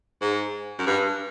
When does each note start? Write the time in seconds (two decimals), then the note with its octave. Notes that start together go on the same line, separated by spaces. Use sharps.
0.21 G#2
0.79 F#2
0.87 G2